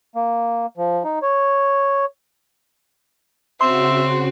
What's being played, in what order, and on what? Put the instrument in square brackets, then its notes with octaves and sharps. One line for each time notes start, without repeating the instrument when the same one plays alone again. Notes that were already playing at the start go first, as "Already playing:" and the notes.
[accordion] A#3
F3
D#4
C#5
[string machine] C#3 F#4 [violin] C4 [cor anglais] E5 [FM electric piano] C6